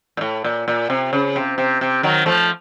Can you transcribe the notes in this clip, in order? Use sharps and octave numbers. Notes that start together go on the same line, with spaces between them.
A#2
A2
A#2
A#2
C3
C#3
C3
C3
C3
D#3 F#3
F3 A3